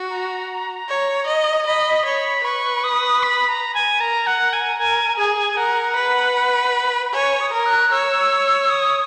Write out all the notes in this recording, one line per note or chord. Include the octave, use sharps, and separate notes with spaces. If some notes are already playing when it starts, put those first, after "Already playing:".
Already playing: F#4
A#5
C#5
D#5
D#5 B5
C#5 B5
B4 C#6
D#6
B5
A#5
G#5
A#4 A#5
F#5
A#4
G#5
A#4 G#5
G#4 G#5
A#4 F#5
B4
C#5 G#5
D#6
A#4
F#6
C#5 E6
D#6